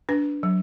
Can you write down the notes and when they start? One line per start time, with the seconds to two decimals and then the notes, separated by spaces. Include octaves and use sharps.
0.09 D4 B4
0.43 F#3